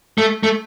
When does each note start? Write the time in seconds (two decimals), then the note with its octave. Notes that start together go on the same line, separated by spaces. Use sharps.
0.18 A3
0.43 A3